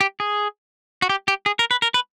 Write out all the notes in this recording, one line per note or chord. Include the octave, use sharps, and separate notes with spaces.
G4
G#4
F#4
G4
G4
G#4
A#4
B4
A#4
B4